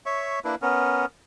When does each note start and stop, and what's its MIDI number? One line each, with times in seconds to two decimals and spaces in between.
0.06 0.39 73
0.06 0.39 76
0.06 0.39 85
0.45 0.55 58
0.45 0.55 62
0.45 0.55 64
0.45 0.55 71
0.62 1.06 59
0.62 1.06 61
0.62 1.06 70